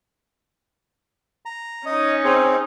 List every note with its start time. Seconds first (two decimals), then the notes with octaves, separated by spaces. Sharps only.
1.46 A#5
1.86 C#4 D#4 D#5
2.24 C4 G#4